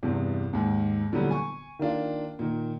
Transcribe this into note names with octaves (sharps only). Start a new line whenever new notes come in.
E2 G2 C3
D#2 G#2
A#2 D3 E3 F#3 G3 B3
G#5 C#6
D#3 A#3 D4 F4
A#2 D#3